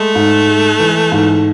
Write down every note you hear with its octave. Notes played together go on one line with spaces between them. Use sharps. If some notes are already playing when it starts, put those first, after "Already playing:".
Already playing: G#3 A3
G#2
G#3
E3
G#2